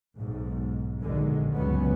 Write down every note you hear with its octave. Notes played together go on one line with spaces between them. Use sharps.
B1 G#2
A#1 D#2 B2 D3 D#3 G#3
C#2 G2 A#2 F#3 B3 C#4